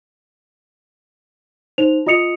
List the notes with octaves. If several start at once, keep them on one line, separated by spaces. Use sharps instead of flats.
D#4 C5 F7
F4 D#5 D#6 C#7 F7